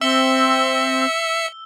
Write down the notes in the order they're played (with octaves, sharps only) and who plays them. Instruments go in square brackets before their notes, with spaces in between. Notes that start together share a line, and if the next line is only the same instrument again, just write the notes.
[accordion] C4 [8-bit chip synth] E5 C#7 [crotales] E6 G7